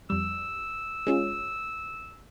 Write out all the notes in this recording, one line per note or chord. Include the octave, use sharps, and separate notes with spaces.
F2 G3 E6
G#3 C#4 F4